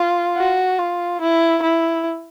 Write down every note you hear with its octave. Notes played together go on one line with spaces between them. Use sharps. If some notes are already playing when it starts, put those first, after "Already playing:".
Already playing: F4
F#4
F4
E4
E4